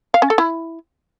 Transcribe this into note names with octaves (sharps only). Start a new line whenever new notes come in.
F5
C#4
A4
E4